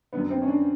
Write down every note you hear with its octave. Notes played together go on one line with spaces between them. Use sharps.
F#2 D3 B3
C4
C#4
D4